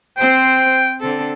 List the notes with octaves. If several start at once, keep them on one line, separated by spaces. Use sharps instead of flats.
C4 C5 G5
D3 C4 A4